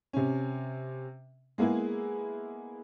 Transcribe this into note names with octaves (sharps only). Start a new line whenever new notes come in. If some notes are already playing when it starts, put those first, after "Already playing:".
C3 C#4
G#3 A#3 B3 E4 G#4